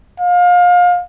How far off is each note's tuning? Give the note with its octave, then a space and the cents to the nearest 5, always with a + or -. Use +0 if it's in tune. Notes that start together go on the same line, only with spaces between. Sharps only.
F5 +30